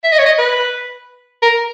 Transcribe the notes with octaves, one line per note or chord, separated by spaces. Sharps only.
E5
D#5
C#5
D#5
B4
A#4